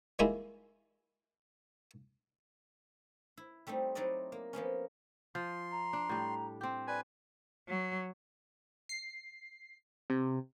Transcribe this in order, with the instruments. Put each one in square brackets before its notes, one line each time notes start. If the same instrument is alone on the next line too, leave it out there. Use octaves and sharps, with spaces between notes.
[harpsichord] G3 G#3 A#3 D#4 E4 G#4
[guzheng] E4
G3 A3 C4 D#4
F#3 D#4 E4 C5 D5 D#5
A#3
F3 A#3 B3 C#4
[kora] F3 [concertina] C6
[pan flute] A#5
[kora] D4
A2 G3
C4 G4
[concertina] B4 G#5 [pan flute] D5
[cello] F#3
[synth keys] C7
C3